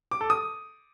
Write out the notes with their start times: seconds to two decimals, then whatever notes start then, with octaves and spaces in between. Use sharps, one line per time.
0.11 D6
0.21 A4
0.30 D#6